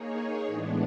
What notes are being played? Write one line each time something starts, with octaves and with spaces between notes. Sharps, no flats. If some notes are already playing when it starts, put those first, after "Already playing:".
Already playing: A#3 D#4 G#4 C#5
A2 E3 G#3 B3 D4